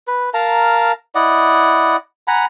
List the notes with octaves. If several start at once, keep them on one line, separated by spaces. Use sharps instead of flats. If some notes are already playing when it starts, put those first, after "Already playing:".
B4
A#4 F5 A5 A#5
E4 D5 D#5 F#5
F#5 G#5 A#5 B5